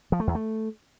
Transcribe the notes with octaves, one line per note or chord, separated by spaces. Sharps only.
F3
A3
E2
A3